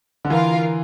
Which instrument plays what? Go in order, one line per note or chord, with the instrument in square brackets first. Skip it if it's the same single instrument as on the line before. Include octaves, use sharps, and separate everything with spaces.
[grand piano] D3
[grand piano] E3 [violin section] F4 A#4 F5